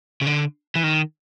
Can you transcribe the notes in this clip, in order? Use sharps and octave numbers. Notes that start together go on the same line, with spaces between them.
C#3
D3
E3
D#3